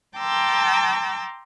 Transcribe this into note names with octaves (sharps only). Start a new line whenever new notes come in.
G5 A5 A#5 C6 D6 E6